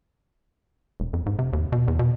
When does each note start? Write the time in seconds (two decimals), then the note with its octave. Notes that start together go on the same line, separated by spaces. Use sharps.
1.00 E1
1.13 F2
1.26 G#2
1.39 C3
1.53 D#2
1.72 B2
1.88 E2
1.99 B2